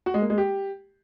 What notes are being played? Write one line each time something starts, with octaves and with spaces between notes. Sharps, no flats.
F#4
G#3
A#3
G#3
G4